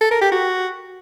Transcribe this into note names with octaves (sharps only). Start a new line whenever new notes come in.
A4
A#4
G4
F#4